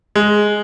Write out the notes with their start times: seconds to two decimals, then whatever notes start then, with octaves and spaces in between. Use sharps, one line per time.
0.15 G#3